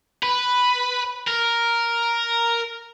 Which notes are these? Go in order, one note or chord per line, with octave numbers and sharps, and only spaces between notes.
B4
A#4